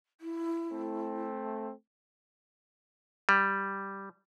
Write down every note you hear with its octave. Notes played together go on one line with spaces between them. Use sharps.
E4
A3 C4
G3